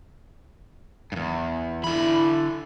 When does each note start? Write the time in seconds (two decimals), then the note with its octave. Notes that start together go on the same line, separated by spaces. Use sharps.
1.12 E2 G2
1.84 D3 E4 B5